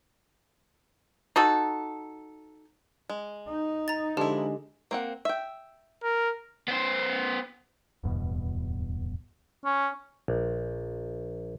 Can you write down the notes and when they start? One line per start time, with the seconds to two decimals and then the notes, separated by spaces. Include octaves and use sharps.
1.36 D#4 F#4 A4
3.09 G#3
3.48 D#4
3.88 A#5 A6
4.17 D3 F3 G#3 E4 G4
4.91 A#3 C4 F#5
5.25 E5 G5
6.03 A#4
6.68 B3 C5
8.04 D1 E2 G2 B2
9.65 C#4
10.28 A#1